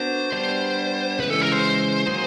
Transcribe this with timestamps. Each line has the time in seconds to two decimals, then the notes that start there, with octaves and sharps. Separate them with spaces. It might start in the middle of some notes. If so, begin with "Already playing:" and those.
Already playing: B3 D4 F#4 A#4 C5
0.32 G3 B3 D4 C5
1.19 C#3 E3 G#3 B4
1.30 A4
1.41 A#4
1.52 C5
2.06 D#3 F#3 A#3 D#4 G#4